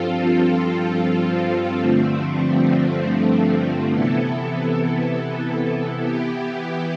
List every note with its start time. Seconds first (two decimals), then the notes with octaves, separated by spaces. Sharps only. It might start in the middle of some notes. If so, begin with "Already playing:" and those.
Already playing: G2 F3 C4 F4 A4
1.79 G2 D3 F3 A3 C4
3.90 C3 E3 B3 E4 A4
6.00 E3 B3 E4 G4